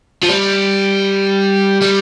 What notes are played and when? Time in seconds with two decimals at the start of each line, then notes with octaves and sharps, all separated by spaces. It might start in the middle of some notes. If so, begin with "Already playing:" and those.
0.23 F3
0.28 G3
1.81 G3